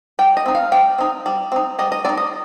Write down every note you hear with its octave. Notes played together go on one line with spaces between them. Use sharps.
G3 G5
D#5
C4 D#4
F5
G3 G5
C4 D#4
G3
C4 D#4
G3 D#5
D#5
C4 D#4 D5
D#5